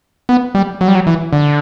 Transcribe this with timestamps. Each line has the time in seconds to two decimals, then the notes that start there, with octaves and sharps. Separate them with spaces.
0.29 B3
0.55 G3
0.81 F#3
0.88 G3
0.95 F#3
1.07 E3
1.33 D3